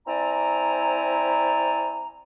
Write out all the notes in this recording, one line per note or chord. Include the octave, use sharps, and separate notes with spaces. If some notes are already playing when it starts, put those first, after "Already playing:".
C4 E4 D5 G#5 A#5